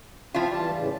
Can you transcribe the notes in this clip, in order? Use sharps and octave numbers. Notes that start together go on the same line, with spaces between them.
F3 C4 E4 F4
E3 G3 F4 A5
A2 C#3 E3